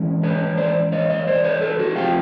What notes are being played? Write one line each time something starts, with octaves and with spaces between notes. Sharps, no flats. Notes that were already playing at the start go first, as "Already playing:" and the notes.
Already playing: A2 E3 G#3 C#4
B4 C#5
C5 D5
C#5 D#5
C#5 D#5
C5 D5
B4 C#5
A4 B4
F#4 G#4
F3 A3 C4 F4 G4